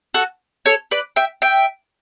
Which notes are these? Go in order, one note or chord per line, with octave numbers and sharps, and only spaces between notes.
F#4 A4
A4 C#5
B4 D5
E5 G5
E5 G5